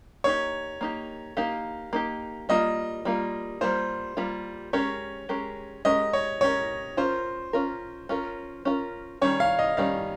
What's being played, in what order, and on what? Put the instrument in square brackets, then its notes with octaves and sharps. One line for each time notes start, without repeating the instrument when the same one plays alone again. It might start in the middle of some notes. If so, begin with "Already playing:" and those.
[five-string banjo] A#3 D#4 G4 [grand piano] C#5
[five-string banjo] A#3 D#4 G4
[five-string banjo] A#3 D#4 G4 [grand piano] F5
[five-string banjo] A#3 D#4 G4
[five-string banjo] G3 A#3 F4 [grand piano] D#5
[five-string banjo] G3 A#3 F4
[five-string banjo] G3 A#3 F4 [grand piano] C5
[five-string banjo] G3 A#3 F4
[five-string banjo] G#3 C#4 G4 A#4 [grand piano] C#5
[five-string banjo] G#3 C#4 G4 A#4
[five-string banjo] G#3 C#4 G4 A#4 [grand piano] D#5
[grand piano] C#5
[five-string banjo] G#3 C#4 G4 A#4 [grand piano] C#5
[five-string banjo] C#4 F4 A#4 [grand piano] C5
[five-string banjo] C#4 F4 A#4
C#4 F4 A#4
C#4 F4 A#4
[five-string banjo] D#3 G3 C#4 [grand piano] C#5
[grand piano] F5
D#5
[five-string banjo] D#3 G3 C#4 [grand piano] F5